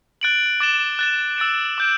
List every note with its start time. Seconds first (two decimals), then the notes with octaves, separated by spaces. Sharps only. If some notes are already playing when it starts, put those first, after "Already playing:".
0.21 F#6 A6 D7 F#7
0.60 D6 A6 E7 G7
0.99 F#6 A6 E7
1.38 E6 A6 D7
1.78 D6 G6 D7